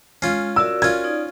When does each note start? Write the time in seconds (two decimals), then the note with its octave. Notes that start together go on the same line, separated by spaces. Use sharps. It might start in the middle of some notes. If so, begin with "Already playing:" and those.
0.22 G#3 C#4 F4
0.56 F#4 A#4 D5 E6
0.82 C#4 F4 G#6
1.04 D#4 D5